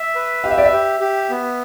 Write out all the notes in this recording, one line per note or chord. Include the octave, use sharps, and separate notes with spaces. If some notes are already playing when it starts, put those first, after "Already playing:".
Already playing: E5
B4
G4 F5
E5
D5
E5
G4
G4
B3